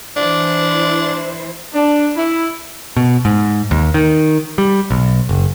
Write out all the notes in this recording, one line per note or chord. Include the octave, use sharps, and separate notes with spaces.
E3 D4 E4 C5
D4
E4
B2
G#2
D#2
D#3
G3
B1
F#1